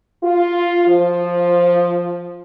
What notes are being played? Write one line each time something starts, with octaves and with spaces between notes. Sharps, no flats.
F4
F3